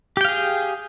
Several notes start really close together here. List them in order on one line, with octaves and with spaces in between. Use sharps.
G4 G5 F5 G#4